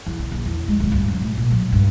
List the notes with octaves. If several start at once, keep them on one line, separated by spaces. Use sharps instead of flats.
E2
C#3
A#1
E2
G#3
D1
G2
F#2
A2
A#2
F#3
G2